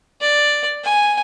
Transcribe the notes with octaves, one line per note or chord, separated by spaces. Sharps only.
D5
G#5